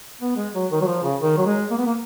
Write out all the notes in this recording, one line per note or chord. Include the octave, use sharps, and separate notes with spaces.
B3
G#3
F#3
D#3
F#3
F3
C#3
D#3
F#3
G#3
A#3
B3
A#3